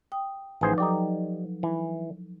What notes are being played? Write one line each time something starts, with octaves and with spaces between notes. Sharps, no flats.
G5 D#6
A1 F3 D#4 G#4 B4 C5
F#3 D#4 G4 A4 D5
E3